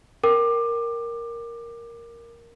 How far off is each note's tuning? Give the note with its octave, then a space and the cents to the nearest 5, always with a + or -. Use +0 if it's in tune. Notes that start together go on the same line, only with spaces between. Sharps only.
A#4 +0 G5 +0 D6 +20